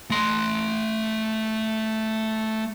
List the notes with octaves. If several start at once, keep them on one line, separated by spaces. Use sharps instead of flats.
A3 C6